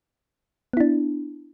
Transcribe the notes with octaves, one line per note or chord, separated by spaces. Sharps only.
B3 D4 E4